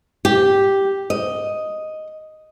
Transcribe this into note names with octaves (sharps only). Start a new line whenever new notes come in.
G4
D#5